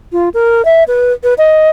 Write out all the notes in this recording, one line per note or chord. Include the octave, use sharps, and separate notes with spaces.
F4
A#4
E5
B4
B4
D#5